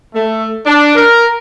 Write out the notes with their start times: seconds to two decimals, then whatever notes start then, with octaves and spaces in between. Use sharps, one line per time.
0.14 A3
0.65 D4
0.95 A#4